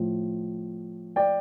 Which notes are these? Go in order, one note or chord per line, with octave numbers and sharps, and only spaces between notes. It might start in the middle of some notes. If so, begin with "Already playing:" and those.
Already playing: A2 F3
D5 G5